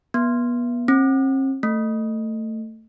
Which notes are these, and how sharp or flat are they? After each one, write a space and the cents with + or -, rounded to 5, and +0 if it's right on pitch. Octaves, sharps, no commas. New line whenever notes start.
B3 -35
C4 +45
A3 +15